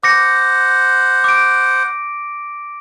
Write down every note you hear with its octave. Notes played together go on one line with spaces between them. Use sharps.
C5 F#5 D6 A#6 C#7
D6 D7